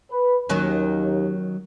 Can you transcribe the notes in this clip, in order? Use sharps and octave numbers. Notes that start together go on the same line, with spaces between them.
B4
D#2 D#3 F#3 C#4